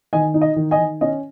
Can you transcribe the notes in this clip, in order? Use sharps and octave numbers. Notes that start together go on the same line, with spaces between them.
D#3 D#5 G#5
D#4
D#5
D#3
D#5 G#5
D#3
C#4 D#5